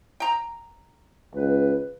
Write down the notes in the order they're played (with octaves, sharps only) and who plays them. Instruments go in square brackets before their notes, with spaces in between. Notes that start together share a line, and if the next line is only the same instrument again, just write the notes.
[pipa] G5 A#5
[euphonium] C#2 [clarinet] B4